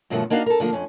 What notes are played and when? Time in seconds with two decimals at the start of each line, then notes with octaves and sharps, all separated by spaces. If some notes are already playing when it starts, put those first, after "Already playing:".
0.10 G2 B2 D#3 F3 F#3 A3
0.30 A#3 D4 D#4 F#4 F5
0.46 A4 A#4
0.60 D3 F3 G3 A#3
0.73 F2 C#4